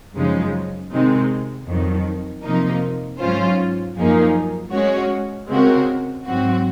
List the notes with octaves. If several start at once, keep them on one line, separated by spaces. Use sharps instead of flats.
F#2 C#3 F3 G#3 D#4
C3 D#3 G#3 C4 D#4
F2 D#3 F#3
C3 F3 A#3 D#4
G#2 F#3 C#4 F4 C5
F#2 F3 A#3 D#4 G#4
G#3 C#4 F#4 C#5
C#3 G#3 C4 F#4 A#4
G#2 F#3 C4 F#4